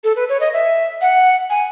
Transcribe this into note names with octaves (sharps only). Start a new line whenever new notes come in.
A4
B4
C#5
D#5
E5
F#5
G#5